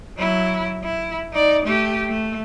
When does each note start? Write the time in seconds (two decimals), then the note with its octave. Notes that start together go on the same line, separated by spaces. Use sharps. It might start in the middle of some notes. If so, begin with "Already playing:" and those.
0.18 F#3 E4
0.84 E4
1.33 D#4 D5
1.65 A3 G4
2.09 A3